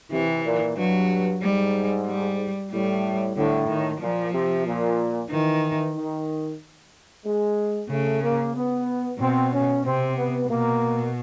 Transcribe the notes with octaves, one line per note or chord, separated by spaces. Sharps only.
C3 E3
A#2
G2 F#3
G#2 G3
G3
A2 G3
A2 D3
D#3
A#2 F3
C3
A#2
D#3 E3
D#3
G#3
C#3 A3
A#3
B3
B2 C4
C#4
C3 C4
B3
B2 A#3